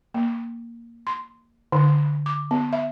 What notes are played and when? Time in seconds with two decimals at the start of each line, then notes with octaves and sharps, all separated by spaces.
0.14 A#3
1.07 C6
1.72 D3
2.26 D6
2.51 B3
2.73 E5